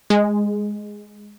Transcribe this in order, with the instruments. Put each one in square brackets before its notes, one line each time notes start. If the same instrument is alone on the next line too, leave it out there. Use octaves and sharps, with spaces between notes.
[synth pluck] G#3